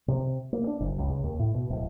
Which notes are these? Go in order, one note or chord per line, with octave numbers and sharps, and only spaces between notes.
C3
A#3
D4
F#1
C#2
C#3
D#2
A2
B2
D1